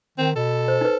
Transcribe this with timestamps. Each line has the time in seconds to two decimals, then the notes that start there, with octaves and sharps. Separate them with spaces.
0.18 D#3 C4
0.36 B2 A4
0.68 C5
0.81 D#4 B4